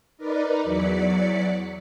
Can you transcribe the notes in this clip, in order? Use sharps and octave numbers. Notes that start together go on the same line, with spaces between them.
D#4 A#4 B4 D5
E2 F#3 D5 B6 C#7